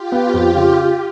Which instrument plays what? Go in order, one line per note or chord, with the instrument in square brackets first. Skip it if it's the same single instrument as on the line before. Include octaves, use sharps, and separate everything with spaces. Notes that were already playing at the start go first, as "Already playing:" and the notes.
Already playing: [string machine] F4 G4
[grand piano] B3
[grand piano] F2 [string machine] F4 G4
[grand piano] C#3